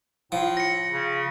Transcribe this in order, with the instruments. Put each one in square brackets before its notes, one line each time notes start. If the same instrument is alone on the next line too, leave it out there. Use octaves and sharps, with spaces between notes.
[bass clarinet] A2 [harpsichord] F3
[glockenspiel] A#6 C#7
[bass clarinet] C#3